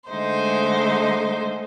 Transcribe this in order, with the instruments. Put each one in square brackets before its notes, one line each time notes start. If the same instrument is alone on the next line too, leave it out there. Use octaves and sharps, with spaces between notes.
[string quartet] D3 G#3 A3 D#4 C5